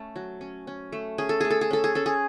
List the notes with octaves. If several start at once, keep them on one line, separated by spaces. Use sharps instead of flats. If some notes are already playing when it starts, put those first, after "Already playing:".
Already playing: A3 C#4 A4
F#3
C#4
C#4
A3
C#4 G#4
A4
A3 G#4
A4
G#4
C#4 A4
G#4
C#4 A4
G#4